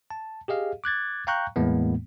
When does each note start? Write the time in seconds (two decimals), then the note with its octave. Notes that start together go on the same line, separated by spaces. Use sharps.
0.10 A5
0.48 G4 G#4 D#5 F5
0.84 D6 F#6 G#6 A6
1.27 F5 G5 A#5 C#6 F#6 G6
1.56 E2 A2 E3 G#3 A#3 B3